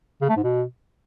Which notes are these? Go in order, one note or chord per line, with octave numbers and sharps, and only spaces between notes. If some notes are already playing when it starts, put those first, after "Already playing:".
C#3
A3
G#2
B2